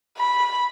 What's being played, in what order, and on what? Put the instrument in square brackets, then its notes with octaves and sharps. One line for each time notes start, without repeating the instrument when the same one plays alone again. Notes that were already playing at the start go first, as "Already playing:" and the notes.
[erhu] B5